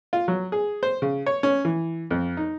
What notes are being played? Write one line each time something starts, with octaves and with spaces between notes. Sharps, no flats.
F4
F#3
G#4
C5
C#3
C#5
C#4
E3
F2
D#4